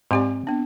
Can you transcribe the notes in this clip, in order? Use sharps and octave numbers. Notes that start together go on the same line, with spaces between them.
G#2 C4 G4 D5
B3 D4